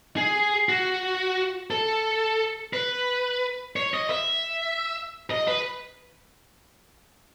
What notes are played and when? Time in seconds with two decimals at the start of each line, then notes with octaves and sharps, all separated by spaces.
0.17 G#4
0.69 F#4
1.71 A4
2.73 B4
3.76 C#5
3.94 D#5
4.10 E5
5.30 D#5
5.48 B4